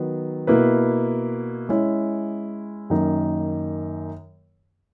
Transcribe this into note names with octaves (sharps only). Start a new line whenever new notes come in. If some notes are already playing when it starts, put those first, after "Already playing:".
Already playing: D#3 F#3 B3
B2 A#3 E4 B4
G#3 C#4 E4
F#2 D#3 A#3 D#4